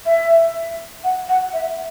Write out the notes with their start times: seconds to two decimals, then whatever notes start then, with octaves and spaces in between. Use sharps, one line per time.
0.06 E5
1.04 F#5
1.29 F#5
1.53 E5